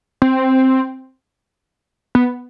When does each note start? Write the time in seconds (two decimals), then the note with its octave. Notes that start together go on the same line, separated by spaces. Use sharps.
0.22 C4
2.15 B3